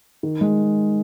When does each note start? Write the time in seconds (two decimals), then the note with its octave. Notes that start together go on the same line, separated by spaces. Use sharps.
0.23 D#3
0.41 G#3